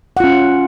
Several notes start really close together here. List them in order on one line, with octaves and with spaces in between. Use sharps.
F#5 F4 C#4